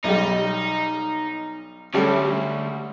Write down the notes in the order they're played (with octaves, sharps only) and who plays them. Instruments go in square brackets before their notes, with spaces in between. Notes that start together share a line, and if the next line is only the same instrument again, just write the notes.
[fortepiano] B1 G3 [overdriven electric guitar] D#4
[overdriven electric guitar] D2 [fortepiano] G3 A3 C#4